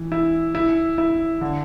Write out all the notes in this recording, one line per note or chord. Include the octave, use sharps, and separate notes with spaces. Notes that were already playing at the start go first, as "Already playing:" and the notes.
Already playing: E3
E4
E4
E4
D3